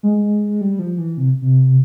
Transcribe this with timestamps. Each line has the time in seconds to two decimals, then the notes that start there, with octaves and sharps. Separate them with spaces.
0.03 G#3
0.61 G3
0.79 F3
0.98 E3
1.17 C3
1.42 C3